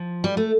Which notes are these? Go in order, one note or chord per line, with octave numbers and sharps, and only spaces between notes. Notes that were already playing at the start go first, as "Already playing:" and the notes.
Already playing: F3
G3
A3